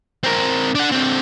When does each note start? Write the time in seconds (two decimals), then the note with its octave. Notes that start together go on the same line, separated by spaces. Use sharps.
0.23 C4 A#4
0.75 D4 F#5
0.92 D3 C4